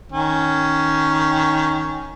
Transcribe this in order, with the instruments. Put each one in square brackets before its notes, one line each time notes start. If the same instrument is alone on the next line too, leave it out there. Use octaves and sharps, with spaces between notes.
[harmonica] D#3 C#4